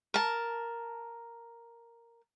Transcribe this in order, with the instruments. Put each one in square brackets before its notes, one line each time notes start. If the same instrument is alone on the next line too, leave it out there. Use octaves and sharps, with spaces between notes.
[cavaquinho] A#4 A5